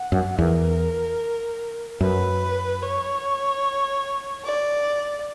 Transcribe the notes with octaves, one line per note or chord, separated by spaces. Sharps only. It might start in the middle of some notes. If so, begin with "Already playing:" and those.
Already playing: F#5
F#2
E2 A#4
F#2 B4
C#5
D5